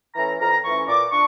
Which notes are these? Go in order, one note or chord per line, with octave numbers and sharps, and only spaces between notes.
E3 A3 C#4 A#5
F2 A#5
E3 A3 C#4 C#6
A#2 D6
D4 C#6